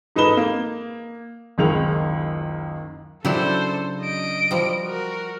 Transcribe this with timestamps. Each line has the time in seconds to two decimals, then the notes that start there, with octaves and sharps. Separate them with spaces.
0.16 G#2 D#4 A4 B4 E7 G7
0.37 A#3
1.58 F#1 C#2 D#3 G#3 F7
3.25 C#3 F#3 D4 E4 G4 A4 C5
4.01 D#5 D7
4.51 F3 G3
4.84 F#4 A#4